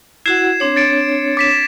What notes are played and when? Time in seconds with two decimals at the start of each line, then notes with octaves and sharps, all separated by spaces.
0.26 E4 F#4 F#5 G#6 C7 E7
0.60 C4 D4 C#5
0.76 A6 C#7 D7
1.37 D6 B6 E7